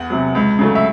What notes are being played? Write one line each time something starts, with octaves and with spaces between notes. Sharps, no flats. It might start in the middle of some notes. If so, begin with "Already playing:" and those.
Already playing: E2 F#5
C3 F#3
C#2
C#3 F#3 A3
E5